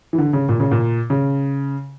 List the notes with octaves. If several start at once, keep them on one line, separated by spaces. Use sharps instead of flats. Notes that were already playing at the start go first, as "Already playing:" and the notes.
E3
D3
C#3
A#2
C#3
A#2
C#3